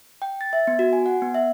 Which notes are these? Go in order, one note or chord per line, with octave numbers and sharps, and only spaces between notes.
G5
A6
E5
B3
F#4
G#5
F#5
B3
E5